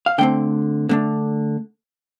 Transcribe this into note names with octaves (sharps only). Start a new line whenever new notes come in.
F5
D3 A3 C4 G5
D3 A3 D4